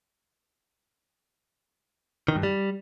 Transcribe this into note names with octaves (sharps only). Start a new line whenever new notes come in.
D#3
G2
G3